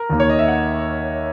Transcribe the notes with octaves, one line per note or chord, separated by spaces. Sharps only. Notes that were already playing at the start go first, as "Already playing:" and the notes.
Already playing: A#4
D#2 D#3 A#3
C#5
D#5
E5
F#5